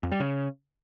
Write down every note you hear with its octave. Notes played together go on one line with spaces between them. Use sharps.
F2
G3
C#3